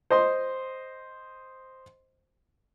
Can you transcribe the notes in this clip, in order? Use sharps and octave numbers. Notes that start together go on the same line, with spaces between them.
C5 D#5 C6